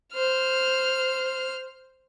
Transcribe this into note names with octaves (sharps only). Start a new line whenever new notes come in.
C5 F6